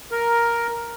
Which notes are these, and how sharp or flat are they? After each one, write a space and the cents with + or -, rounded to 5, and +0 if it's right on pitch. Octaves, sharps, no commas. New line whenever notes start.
A#4 +5